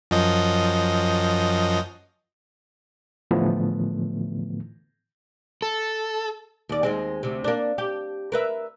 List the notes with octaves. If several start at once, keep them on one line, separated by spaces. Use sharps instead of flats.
F#2 F3 D#5
A2 D3 E3 F3 A3 B3
A4
D#2 D5
D#2 G#3 C4
D2 C3
A#3 D4
G4
A#4 B4 E5